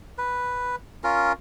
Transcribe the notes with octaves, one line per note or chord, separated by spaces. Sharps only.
B4
C#4 F4 A#4